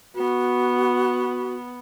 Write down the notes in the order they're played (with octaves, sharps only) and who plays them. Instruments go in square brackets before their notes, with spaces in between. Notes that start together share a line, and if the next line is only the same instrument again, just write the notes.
[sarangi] B3 [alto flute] F#4